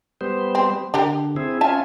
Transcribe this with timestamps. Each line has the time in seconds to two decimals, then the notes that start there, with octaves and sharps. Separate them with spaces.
0.21 G3 B3 C5
0.55 C4
0.94 D3 D4 G4 A#4
1.36 C4 E4 G#4
1.61 C#4 F4 E5 G#5 A5